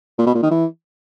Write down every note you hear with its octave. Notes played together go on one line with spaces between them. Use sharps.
A#2
B2
A#2
D#3
E3